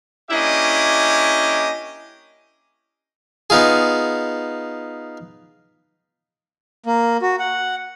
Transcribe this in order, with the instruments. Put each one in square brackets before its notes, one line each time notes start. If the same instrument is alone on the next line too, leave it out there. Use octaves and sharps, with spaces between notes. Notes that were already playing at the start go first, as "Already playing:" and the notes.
[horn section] A#3 C#4 D4 E4 G4 D#5
[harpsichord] B3 D#4 F4 G#4
[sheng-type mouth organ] A#3
F#4
F#5